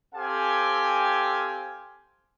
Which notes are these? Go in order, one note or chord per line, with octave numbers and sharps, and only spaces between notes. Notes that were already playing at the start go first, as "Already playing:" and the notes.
C4 G4 A4 F5 G5 G#5